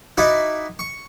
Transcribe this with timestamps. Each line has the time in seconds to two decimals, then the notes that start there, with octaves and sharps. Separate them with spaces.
0.18 D#4 E4 F#4 D5
0.79 C#6